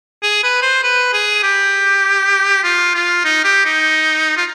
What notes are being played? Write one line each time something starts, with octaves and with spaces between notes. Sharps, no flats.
G#4
B4
C5
B4
G#4
G4
F4
F4
D#4
G4
D#4
F4